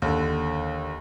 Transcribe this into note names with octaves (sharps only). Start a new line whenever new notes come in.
D#2 D3